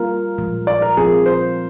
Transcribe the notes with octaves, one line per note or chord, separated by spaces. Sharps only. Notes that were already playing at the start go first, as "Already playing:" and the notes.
Already playing: G3 A#3 F4 A#4
A#2 F3 G#3
D5
A#4
F3 C4 F4 G#4 A#4
C5